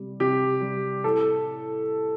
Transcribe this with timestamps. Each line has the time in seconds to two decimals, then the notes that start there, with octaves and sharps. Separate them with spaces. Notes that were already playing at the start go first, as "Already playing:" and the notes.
Already playing: C3 G3
0.20 C3 G4
0.62 G3
1.04 A2 A4